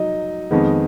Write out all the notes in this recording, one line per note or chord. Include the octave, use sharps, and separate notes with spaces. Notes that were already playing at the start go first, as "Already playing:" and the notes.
Already playing: F#3 D#4 D#5
F2 D#3 G#3 B3